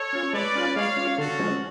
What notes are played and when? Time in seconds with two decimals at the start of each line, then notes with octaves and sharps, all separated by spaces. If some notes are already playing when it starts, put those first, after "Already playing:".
Already playing: A4 C#5
0.13 C#4 F4
0.33 G#3 B4 D5
0.55 C#4 F4
0.76 G#3 C#5 F5
0.97 C#4 F4
1.18 D3 F#4 A4
1.39 F3 G#3 C#4